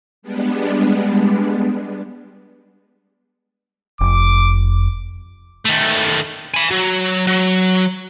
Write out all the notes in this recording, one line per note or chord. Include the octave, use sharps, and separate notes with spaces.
G3 G#3 B3 D4
F1 D6
D#3 A3
G#5 B5
F#3
F#3